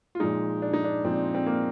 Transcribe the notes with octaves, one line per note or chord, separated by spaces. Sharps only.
F4
A#2 F3 G#3 D#4
D4
D#4
D4
A#2 F3 G#3 C4
C4
A#3